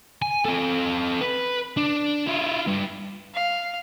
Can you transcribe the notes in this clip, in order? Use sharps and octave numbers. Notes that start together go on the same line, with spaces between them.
G#5
C4 A4
B4
D4
E4 F4
G2
F5